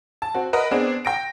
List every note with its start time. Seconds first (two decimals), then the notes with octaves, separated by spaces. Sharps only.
0.22 A5
0.34 C4 F#4
0.53 A#4 B4 D#5 F#5 B5
0.71 B3 C4 D4 G#4
1.05 G5 A#6 D7